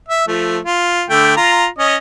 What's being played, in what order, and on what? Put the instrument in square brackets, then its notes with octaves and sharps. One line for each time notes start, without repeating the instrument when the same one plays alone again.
[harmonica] E5
F3 A3
F4
D3 A3 G5
F4 A#5
C#4 D#5